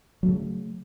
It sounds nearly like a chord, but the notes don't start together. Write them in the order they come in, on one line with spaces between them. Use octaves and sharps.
F#3 A3 C#3